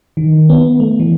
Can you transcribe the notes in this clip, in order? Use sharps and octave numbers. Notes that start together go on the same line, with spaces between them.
D#3
B3
A3
E3